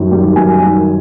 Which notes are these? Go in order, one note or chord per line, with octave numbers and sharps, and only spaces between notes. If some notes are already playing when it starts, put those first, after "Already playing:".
Already playing: F#2 D#3 G3
D#3 G3
F#2 G#5
D#3 G3